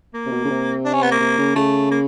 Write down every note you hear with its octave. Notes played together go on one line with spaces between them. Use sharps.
A#3
C3
B2
C#3
C3
D4
C#4
B3
A#3
C3
C#3
C#3 A3
A#3